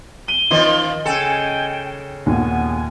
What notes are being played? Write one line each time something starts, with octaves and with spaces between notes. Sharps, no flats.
D#7 G7
D#3 F3 F4 D#5 C6
C#3 A4 G5 G#5
D#2 A#2 B3 G#5